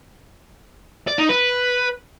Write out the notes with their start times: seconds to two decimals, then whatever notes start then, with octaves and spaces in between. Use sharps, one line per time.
1.07 D5
1.18 D#4
1.29 B4